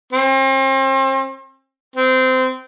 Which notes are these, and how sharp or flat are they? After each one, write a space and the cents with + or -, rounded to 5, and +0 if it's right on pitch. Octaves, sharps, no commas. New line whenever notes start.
C4 +40
C4 -20